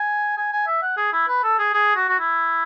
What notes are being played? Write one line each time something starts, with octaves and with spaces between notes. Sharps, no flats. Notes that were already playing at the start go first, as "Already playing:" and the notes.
Already playing: G#5
G#5
G#5
E5
F#5
G#4
E4
B4
A4
G#4
G#4
F#4
F#4
E4